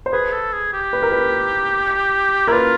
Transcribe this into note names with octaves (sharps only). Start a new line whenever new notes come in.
C5
G#4 B4
A4
G#4
G4
B4
A#4
B4
E4 A#4
F4 B4